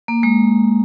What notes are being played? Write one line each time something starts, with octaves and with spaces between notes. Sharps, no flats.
A#3
G#3